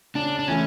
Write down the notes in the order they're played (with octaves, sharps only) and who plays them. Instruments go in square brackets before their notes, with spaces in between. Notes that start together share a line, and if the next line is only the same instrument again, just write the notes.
[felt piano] C#3 [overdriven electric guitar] D4
[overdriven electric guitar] D4
[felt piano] E3 A3 [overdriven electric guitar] C#4